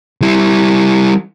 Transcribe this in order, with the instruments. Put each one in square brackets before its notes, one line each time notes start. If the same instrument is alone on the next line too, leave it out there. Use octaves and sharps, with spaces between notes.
[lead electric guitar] G3 E4